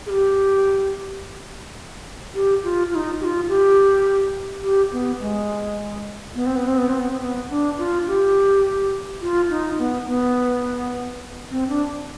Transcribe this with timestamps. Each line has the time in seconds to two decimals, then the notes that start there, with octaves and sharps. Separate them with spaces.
0.06 G#4
0.10 G4
2.35 G4
2.64 F4
2.91 F4
2.95 D#4
3.21 G4
3.24 F4
3.49 G4
4.63 G4
4.92 B3
5.20 G#3
6.35 B3
6.46 C4
6.57 B3
6.67 C4
6.78 B3
6.89 C4
6.99 B3
7.10 C4
7.21 B3
7.50 D4
7.78 F4
8.07 G4
9.21 F4
9.50 D#4
9.78 B3
10.07 B3
11.51 C4
11.69 D4